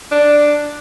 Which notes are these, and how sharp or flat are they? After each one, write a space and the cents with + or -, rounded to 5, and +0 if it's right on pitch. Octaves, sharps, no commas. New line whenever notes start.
D4 +5